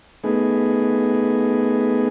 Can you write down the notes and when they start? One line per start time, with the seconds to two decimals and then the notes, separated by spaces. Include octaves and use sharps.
0.24 A3 B3 D#4 G#4